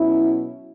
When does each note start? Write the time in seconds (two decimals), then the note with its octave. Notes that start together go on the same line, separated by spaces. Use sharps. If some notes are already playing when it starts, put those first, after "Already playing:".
Already playing: B2 F#3 C#4 E4